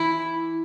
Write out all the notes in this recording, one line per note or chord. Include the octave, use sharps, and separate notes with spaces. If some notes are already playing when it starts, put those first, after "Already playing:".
Already playing: E3 E4